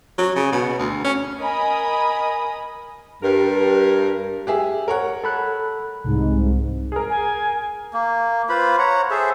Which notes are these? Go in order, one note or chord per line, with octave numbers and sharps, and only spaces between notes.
F#3
C#3
B2
D2
C#4
A#4 D#5 G#5 B5 D#6
G2 A#4
G4 G#4 E5
A#4 C#5 F#5
A4 B5 F#6
C2 G#2
G#4 A#4
G#5
A#3
F4 B4 C5 B5
C#5 F#5 A#5
G#4 A4 C5 E5